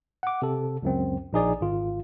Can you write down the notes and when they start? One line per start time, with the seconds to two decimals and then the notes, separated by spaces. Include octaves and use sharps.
0.23 F#5 D6
0.42 C3 A4
0.82 C#2 F#2 C4
1.33 A#1 D#4 G#4 D5
1.61 G#1 F4